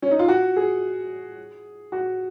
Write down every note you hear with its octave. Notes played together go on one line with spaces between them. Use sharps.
C#4
D#4
F4
F#4
G#4
F#4